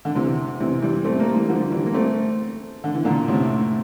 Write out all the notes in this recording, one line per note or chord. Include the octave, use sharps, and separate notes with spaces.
D3
C3 E3
C3 E3
E3 G3
A3 C4
G3 A#3
E3 G3
D3 F3
E3 G3
A#3
A3 C4
D3
E3
A#2 D3
A2 C3